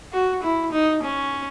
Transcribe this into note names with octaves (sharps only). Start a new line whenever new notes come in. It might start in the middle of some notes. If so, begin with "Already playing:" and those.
F#4
E4
D#4
C#4